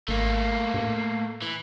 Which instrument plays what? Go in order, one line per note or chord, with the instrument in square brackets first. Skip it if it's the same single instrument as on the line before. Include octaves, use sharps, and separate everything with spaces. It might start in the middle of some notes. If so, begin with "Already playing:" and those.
[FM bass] G#1 [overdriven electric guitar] A3 A#3
[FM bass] A2
[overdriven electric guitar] E3